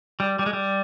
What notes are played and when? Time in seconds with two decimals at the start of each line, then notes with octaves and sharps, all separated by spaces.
0.20 G3
0.39 G3
0.46 G#3
0.53 G3